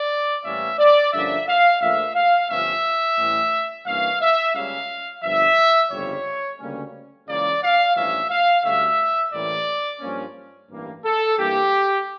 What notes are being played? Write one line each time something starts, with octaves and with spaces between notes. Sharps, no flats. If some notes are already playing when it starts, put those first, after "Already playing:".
Already playing: D5
A2 E3 G3 A#3 C#4 E5
D5
G2 D3 F3 A#3 C#4 E5
F5
A#1 A#2 F3 A3 E5
F5
G1 G2 F3 A3 C#4 E5
A2 E3 G3 C#4
G2 E3 A#3 C#4 F5
E5
C#2 C#3 G3 A#3 C#4 F5
G1 G2 F3 E5
G1 F2 C#3 G3 C#5
D2 C#3 G3 A#3 C#4
C#2 C#3 E3 A#3 D5
F5
A1 G2 F3 A#3 C#4 E5
F5
D2 D3 G3 C#4 E5
A1 A2 E3 G3 A#3 D5
G2 F3 A#3 C#4
A1 G2 E3 A#3
A4
G2 E3 A#3 G4